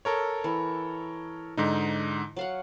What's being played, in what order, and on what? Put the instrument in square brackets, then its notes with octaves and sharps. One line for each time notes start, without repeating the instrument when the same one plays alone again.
[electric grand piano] A4 A#4 C#5
[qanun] E3
[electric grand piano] G#2 D3 D#4
[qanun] F#3 F5 F#5